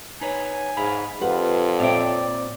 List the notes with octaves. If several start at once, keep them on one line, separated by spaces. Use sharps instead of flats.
D#4 B4 C#5 G#5
G#2 E5 F5 B5
F2 F4 G4 B4 F#5
A#2 C4 C#5 D5 E5 G5